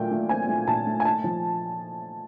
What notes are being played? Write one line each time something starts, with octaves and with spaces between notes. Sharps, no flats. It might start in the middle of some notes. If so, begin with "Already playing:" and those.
Already playing: A#2 F#3 A3 G5
A3
C4 G#5
A3
A#2 A5
A3
G#5
D#4 A5
F3